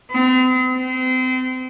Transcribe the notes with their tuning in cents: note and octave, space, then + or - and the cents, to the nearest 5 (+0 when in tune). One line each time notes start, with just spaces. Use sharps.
C4 -40
C4 -30